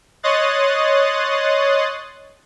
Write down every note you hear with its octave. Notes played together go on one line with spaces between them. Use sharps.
C#5 D#5 C6 D#6 F#6 A6